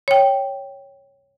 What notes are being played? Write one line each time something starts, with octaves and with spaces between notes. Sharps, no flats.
C#5 G5